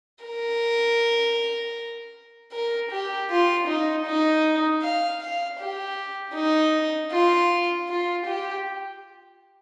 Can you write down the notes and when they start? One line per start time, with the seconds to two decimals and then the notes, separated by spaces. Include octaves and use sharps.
0.24 A#4
2.52 A#4
2.91 G4
3.30 F4
3.68 D#4
4.06 D#4
4.82 F5
5.21 F5
5.59 G4
6.35 D#4
7.12 F4
7.88 F4
8.26 G4